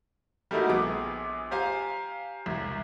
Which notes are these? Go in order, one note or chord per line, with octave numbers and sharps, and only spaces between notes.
G3 A3 A#3 D#4 E4 F#4
A#1 B3 G#4 D6
G4 C5 F5 G#5 A#5
E1 C2